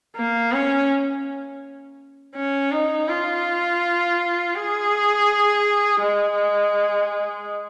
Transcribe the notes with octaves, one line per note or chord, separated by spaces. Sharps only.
A#3
C#4
C#4
D#4
F4
G#4
G#3